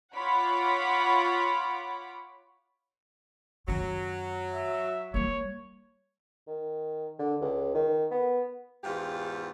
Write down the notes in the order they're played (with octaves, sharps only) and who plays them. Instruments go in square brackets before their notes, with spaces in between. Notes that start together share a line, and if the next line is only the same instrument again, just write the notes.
[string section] F4 C#5 F#5 B5 D6
[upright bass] F#2 D#3 [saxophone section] F#3
[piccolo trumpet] E5
[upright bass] G3 A#3 [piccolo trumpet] C#5
[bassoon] D#3
D3
C#2
D#3
B3
[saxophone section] E2 G#2 F4 G4